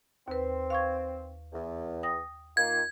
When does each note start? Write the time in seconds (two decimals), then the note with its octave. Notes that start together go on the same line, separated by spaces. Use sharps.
0.28 D#2 C4 B4
0.70 F5 C#6 G#6
1.53 E2
2.03 G5 D#6 A#6
2.57 D#3 A#3 F4 G#6